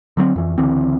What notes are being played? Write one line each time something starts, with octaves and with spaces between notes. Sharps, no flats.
D3 F#3 A#3 C4
F2 E3
C#2 D3 E3 C4